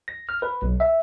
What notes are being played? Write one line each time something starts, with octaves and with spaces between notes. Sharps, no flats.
A#6
F6
B4
B1
E5